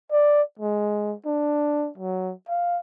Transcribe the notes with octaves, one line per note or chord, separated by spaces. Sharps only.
D5
G#3
D4
F#3
F5